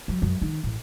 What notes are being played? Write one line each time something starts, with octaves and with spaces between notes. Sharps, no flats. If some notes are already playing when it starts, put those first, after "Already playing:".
F#3
F#2
D#3
A1